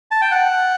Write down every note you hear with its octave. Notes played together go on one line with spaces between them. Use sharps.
A5
G5
F#5